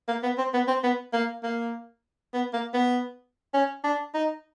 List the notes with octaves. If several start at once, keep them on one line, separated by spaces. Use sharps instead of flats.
A#3
B3
C4
B3
C4
B3
A#3
A#3
B3
A#3
B3
C#4
D4
D#4